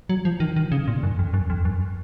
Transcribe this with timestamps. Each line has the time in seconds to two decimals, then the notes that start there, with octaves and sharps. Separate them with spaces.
0.09 F#3
0.25 F3
0.40 D#3
0.56 D#3
0.72 C#3
0.88 A#2
1.03 F#2
1.19 F2
1.34 F#2
1.50 F2
1.65 F#2